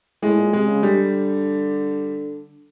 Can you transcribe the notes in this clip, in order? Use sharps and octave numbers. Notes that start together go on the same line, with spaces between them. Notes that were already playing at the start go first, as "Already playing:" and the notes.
A2 G#3
A#2
C3 G#3
C#3
D3 G3